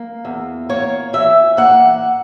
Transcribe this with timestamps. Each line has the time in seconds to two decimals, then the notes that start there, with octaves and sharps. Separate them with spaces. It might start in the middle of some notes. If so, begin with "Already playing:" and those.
Already playing: A#3
0.25 E2
0.69 A#3 C#5
1.13 E3 E5
1.57 A#3 F#5